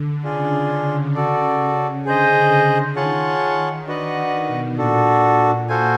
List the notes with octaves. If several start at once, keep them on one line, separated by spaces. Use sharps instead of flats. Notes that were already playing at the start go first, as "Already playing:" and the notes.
Already playing: D3
C#3 D4 F4 G#4
F#4 A4 D5
D3 G#4 C5 D#5
D#3 F4 G#4 C#5 F#5 A5
D#3 D4 F#4 B4 D#5 F#5
B2
A#2 D4 F#4 A4
F#4 A4 C5 F5 G#5